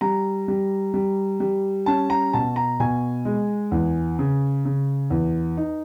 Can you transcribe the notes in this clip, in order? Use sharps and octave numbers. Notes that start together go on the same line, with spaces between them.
G3 A#5
G3
G3
G3
C#4 A5
A#5
B2 A5
A#5
B2 G#5
G#3
E2
C#3
C#3
E2
D#4